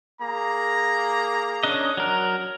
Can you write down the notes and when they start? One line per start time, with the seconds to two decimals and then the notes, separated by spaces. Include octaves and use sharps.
0.21 A#3 G#4 A#5
1.63 C#4 D4 D#5
1.97 F#3 A#4